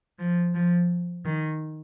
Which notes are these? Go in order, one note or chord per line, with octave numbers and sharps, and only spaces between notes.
F3
F3
D#3